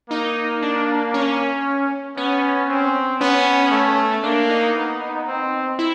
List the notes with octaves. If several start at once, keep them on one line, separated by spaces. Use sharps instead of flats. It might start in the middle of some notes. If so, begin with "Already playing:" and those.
A#3 D#4
D4
C#4
B3 C#4
C4
B3 C#4
A3
A#3 D4
D#4
B3
C4
E4